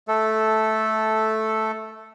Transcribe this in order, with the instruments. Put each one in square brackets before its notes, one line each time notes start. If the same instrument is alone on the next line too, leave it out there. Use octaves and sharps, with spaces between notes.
[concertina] A3 A4